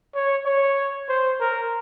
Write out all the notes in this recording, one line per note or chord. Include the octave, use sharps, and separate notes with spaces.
C#5
C#5
C5
A#4